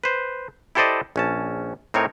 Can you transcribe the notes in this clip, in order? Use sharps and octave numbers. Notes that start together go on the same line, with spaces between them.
B4 C5
E4 G4 A4 C5 D5 D#5
A#1 C#4 A5
A2 C4 D#4 A#4 C#5